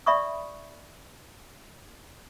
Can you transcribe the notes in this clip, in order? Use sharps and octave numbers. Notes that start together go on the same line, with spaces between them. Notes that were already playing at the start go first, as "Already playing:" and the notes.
D5 E5 B5 C#6 D#6